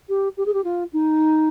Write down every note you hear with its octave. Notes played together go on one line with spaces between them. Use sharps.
G4
G4
G#4
G4
F4
D#4